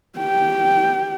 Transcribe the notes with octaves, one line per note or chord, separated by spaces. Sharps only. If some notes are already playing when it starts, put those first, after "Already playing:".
G4 G5